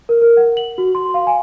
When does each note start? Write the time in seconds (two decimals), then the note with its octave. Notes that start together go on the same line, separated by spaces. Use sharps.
0.09 A#4
0.22 A#4
0.37 F#5
0.57 F#7
0.78 F#4
0.95 C6
1.14 F5
1.27 G#5